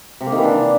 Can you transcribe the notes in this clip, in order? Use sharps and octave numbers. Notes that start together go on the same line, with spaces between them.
C3
A#3
D#3
E3
D4